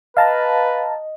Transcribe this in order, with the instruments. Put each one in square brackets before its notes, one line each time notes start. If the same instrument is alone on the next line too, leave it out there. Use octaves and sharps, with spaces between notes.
[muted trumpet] B4 [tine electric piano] D#5 [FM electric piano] F5 A5 A#5